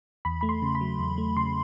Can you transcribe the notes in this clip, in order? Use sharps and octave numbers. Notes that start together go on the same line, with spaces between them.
E2 B5
A3 B5
C6
C#3
B5
F#3
E2
A3
C#3 C6